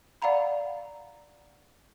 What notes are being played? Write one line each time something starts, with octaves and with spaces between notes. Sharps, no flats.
D5 F5 F#5 A#5 B5